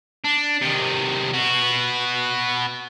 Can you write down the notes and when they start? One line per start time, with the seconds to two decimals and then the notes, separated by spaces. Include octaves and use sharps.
0.25 D4
0.62 C3 D#3
1.33 B3 F#4